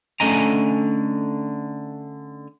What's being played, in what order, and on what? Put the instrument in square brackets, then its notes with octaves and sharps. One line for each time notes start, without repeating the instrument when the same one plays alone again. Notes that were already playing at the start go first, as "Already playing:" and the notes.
[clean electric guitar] D3 A3 C#4 D#5 G#5 A#5